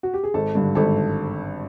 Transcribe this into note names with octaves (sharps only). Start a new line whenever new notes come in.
F#4
G4
G#4
G#1 A4
G2 D3
G#1 A4